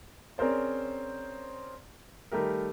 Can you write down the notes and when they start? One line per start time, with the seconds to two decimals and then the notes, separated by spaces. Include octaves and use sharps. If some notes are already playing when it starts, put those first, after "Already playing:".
0.38 C4 C#4 G#4 A#4 C5 D5
2.32 D#3 G3 A3 G4 A#4